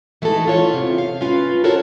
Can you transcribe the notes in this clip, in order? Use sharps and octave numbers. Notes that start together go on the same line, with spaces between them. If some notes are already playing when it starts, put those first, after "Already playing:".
E3 A3 D#4 F#4 A4
C#4 F4 C#5
E2 C3
F5
C#4 F4 B4
F#4 A4 A#4 C5 C#5